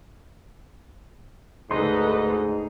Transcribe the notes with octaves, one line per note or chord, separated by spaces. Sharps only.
D2 G#2 D#4 A4 B4 D#5 C6